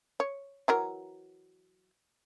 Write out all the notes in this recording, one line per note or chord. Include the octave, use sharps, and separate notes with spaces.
C#5
E3 F#3 A#4